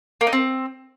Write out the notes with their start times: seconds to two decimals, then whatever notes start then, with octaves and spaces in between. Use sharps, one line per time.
0.21 A#3
0.27 D#4
0.33 C4